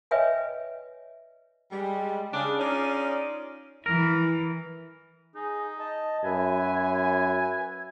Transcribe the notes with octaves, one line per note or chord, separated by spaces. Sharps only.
B4 C#5 D#5 E5 G5 G#5
G3 G#3
C#3 D4
C#4 D#4 F4 G#4 C#5 D5
E3 A#4
D#4 G#4
D#5 A5
F#2 B4 E5 G#5